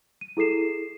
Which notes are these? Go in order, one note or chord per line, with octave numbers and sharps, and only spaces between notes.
D#7
E4 G#4 A4 C7 E7